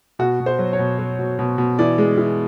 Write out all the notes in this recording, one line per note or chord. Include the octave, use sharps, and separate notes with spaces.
B2 F#4
B2
C5
F#3
C#5
B2
F#3
B2
B2
B2
E3 D5
G#3
E3